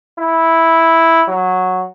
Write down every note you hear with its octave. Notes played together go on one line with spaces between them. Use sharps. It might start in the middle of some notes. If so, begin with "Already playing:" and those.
E4
F#3